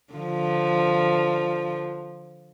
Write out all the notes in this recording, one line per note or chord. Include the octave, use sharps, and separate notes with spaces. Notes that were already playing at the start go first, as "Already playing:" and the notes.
D3 F3